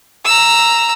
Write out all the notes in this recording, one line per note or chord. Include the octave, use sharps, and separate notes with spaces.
A#5 E6